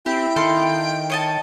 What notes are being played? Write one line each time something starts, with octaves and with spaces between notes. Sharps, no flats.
C4 E4 G4 G5
D#3 A4 F5 C6
C#5 D#5 A5